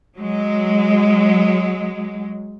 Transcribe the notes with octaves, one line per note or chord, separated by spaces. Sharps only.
F#3 G#3